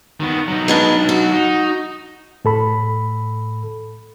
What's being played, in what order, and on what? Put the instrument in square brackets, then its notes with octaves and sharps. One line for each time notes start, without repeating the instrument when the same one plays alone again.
[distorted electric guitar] D#3 B3
F#3 D#4
[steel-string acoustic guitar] G#3 B3 D4
F#4
[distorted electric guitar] D#4
[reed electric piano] A2 A4 B5